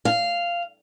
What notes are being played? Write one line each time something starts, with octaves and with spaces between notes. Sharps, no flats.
F5